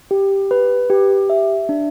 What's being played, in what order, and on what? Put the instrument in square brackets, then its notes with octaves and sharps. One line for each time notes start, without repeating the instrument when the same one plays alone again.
[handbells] G4
B4
G4
E5
D4